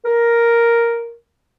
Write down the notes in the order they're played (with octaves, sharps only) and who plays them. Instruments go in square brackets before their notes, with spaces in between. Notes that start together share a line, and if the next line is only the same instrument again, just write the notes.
[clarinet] A#4